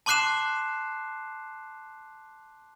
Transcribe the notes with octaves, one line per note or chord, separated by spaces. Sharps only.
A5 C6 D6 F#6 C7 E7